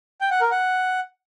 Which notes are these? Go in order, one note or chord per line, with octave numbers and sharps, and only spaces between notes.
G5
F#5
A#4
F#5